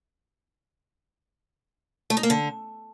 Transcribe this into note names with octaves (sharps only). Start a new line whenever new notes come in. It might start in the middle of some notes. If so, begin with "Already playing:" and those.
A3
D#4
A#3
D3